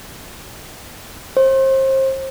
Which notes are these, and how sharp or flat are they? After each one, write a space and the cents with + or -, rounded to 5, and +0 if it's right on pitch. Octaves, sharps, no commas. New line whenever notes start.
C5 +30